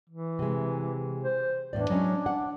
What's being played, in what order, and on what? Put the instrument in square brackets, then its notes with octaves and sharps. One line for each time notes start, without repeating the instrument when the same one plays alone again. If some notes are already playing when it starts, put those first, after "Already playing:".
[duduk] E3
[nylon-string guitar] C3 G#3
[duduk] C5
[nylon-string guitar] E2 A2 D5 [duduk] D4
[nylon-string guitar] F#3 G#3 C#4
F#5